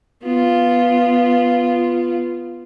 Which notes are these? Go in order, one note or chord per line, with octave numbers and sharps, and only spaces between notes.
B3 F4